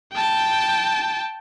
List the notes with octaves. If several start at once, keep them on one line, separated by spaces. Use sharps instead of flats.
G5 A5